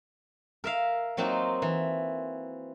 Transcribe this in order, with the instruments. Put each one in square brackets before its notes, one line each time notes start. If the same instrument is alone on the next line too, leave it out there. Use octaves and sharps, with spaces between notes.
[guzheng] A#4 E5 F5
F#3 A#3 C4 D#4 F4 F#4
E3